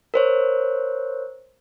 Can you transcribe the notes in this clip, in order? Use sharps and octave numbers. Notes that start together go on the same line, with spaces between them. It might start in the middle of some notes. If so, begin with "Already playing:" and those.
A#4 C5 C#5